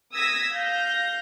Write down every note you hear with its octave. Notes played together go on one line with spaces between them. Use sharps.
D#6 E6 G#6 A#6 B6
F5 G6 A#6